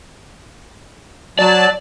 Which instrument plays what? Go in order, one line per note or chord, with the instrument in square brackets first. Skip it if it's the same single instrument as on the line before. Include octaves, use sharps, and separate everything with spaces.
[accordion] F#3 A5 [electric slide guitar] D5